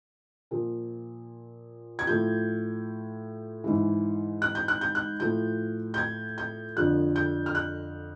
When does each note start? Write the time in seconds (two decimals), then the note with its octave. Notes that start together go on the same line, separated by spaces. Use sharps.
0.51 A#2 F3
1.99 G#6
2.07 A2 F3 G6
3.64 G#2 E3
4.42 F#6
4.55 G6
4.68 F#6
4.81 G6
4.95 F#6
5.20 A2 F3 G6
5.94 G6
5.98 G#6
6.38 G6
6.76 F2 D3 F3 F#6
7.16 G6
7.46 F6
7.55 F#6